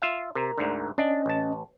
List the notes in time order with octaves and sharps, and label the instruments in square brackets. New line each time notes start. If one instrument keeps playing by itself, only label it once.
[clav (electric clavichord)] F4 E5 F5
[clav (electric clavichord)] C3 [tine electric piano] A#4 A#5
[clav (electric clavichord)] D2 G#2 D3
[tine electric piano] C#4 D#5 [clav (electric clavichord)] D4
[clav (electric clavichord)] A1 A5